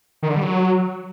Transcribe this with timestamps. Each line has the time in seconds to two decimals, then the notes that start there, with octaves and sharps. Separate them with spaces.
0.23 D#3
0.29 D3
0.36 G3
0.43 F#3